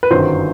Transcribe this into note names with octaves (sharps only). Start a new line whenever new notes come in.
B4
G1 F#2 D#3 F#3 C5